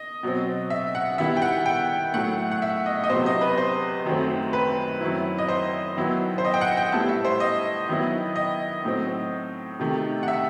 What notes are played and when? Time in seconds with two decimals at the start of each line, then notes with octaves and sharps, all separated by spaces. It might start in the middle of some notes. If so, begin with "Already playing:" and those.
Already playing: D#5
0.23 B2 F#3 C4
0.70 E5
0.95 F#5
1.18 D#3 G3 B3 E4 E5
1.37 G5
1.42 F#5
1.66 G5
2.14 A2 F#3 A3 F#5
2.52 F#5
2.62 E5
2.86 D#5
3.04 D#5
3.10 E2 C3 F#3 B3 C5
3.26 D#5
3.41 B4
3.58 C5
4.05 F#2 D#3 F#3 A3 C4
4.53 B4
5.01 F#2 D#3 F#3 C4 E4
5.38 D#5
5.49 C5
5.97 D#3 F#3 B3 E4
6.38 C5
6.45 D#5
6.54 G5
6.61 F#5
6.77 G5
6.92 A2 G3 B3 E4 A5
7.09 E5
7.25 C5
7.40 D#5
7.89 D#3 F#3 B3 E4
8.36 D#5
8.85 A2 F#3 C4 D#4
9.80 C3 D#3 A3 D#4
10.23 F#5
10.28 E5